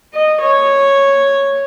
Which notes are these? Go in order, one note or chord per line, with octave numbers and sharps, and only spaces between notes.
D#5
C#5